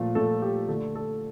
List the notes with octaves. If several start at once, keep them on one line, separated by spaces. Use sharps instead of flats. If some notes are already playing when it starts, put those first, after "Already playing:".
Already playing: A#2 F3 A3
A#2 F3 A3 A4
G4
D3 A3 A4
A4